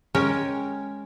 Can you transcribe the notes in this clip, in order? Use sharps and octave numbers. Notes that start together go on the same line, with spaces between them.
G#3 C#4 A#4 C#5 G5